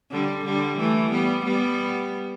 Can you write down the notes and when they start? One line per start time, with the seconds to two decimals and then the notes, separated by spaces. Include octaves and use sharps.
0.11 D3 G3
0.45 D3 G3
0.78 E3 A3
1.11 G3 B3
1.45 G3 B3